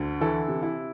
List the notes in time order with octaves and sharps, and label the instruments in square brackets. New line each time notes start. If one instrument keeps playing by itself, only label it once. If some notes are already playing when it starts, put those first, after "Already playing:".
Already playing: [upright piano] D2 D3
E3 E4 A4
C3
E4